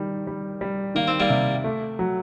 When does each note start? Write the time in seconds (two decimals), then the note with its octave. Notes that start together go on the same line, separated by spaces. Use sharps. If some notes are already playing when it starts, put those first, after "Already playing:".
Already playing: D#3 G3
0.27 G3
0.61 G3
0.95 D#3 A#3
1.08 C4
1.20 G3 A#3
1.29 C3
1.64 A3
1.99 F#3